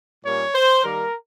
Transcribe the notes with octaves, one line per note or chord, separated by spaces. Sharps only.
A#2 G3 A#3 C#4 C#5
C5
D#3 G3 A#3 A#4